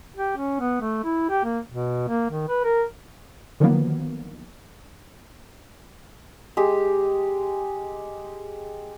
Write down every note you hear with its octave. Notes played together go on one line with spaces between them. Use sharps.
G4
C#4
B3
A3
E4
G4
A#3
B2
A#3
D#3
B4
A#4
D3 D#3 F3 F#3 A#3 B3
G#3 G4